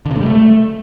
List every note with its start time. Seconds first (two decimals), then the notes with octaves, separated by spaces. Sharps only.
0.06 D3
0.11 C3
0.16 A3
0.21 G3
0.26 A3